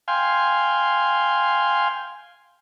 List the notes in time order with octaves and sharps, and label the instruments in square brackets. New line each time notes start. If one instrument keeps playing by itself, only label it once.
[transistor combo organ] F5 G5 G#5 C6